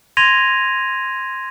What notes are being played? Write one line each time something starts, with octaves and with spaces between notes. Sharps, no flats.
C6 G#6 A#6 D#7 F7